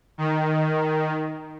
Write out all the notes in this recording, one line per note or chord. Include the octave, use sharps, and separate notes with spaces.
D#3